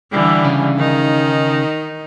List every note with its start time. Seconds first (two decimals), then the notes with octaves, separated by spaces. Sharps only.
0.11 D3 E3 G3
0.45 C#3
0.76 D#3 D#4